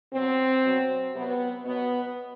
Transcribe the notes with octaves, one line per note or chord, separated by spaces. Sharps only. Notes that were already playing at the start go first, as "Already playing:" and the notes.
B2 F#3 C4
B2 F#3
C3 F#3 B3
B2 F#3 B3